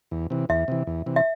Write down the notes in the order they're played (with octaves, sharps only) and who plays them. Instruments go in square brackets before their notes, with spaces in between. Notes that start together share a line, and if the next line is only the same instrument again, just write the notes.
[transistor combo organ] E2
C3 E3
[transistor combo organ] E2 [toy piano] E5
[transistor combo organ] C3 E3
E2
C3 E3
[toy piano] E5